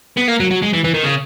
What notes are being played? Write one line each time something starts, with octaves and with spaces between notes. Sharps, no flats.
B3
A#3
F#3
F#3
G#3
E3
E3
D#3
C#3